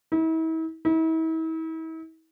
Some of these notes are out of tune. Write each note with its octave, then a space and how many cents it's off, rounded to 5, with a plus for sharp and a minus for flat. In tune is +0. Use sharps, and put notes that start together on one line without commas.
E4 -40
E4 -40